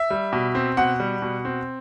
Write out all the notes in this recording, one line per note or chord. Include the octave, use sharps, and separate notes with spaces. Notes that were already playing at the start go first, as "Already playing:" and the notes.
Already playing: E5
G3
B2
C4
B2 F#5
G3
B2
C4